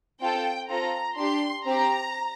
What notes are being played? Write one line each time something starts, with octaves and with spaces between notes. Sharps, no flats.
C4 F4 A4 G5
C4 F4 A4 A#5
D4 G4 C6
C4 G4 A#5